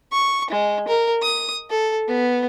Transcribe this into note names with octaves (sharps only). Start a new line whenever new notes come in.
C#6
G#3
A#4
D#6
A4
B3